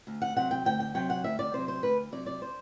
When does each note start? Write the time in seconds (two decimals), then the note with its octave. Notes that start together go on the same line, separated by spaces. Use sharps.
0.07 D2
0.22 F#5
0.36 C3 F#3 F#5
0.51 G5
0.65 D2 G5
0.80 G5
0.95 C3 F#3 G5
1.10 F#5
1.24 D2 E5
1.39 D5
1.53 C3 F#3 C5
1.68 C5
1.83 D2 B4
2.12 C3 F#3 D5
2.26 D5
2.42 C5